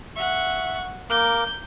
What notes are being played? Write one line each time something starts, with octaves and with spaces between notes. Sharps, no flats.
E5 F#5 C#6
A#3 A#4 D6 G6